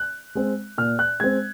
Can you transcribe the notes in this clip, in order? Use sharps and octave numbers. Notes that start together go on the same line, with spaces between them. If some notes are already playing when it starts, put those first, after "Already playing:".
Already playing: F#6
G#3 C4
A#2 F6
F#6
G#3 C4 G#6